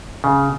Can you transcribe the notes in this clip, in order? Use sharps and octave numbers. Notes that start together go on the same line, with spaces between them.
C#3